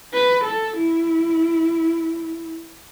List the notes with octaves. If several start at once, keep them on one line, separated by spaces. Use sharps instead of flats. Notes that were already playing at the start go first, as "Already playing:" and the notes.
B4
A4
E4